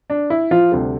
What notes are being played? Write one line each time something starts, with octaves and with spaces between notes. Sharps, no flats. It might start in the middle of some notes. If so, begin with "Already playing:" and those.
D4
E4
F3 F4
D2 C3 G3